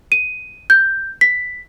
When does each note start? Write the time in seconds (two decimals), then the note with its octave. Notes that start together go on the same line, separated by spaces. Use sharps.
0.12 D#7
0.70 G6
1.21 B6